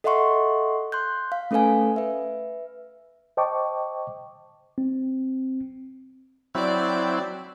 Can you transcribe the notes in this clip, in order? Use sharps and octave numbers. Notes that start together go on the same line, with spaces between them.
A4 D#5 E5 F#5 C6 C#6
C6 F#6 G6
F5
A3 C#4 A4 B4 F5 G#5
B4 E5
C5 D#5 G5 A5 C#6 D6
C4
F#3 C4 E4 D5